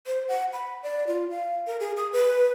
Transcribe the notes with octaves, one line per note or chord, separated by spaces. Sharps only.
C5
F#5
B5
D5
F4
F5
A#4
G#4
D#6
B4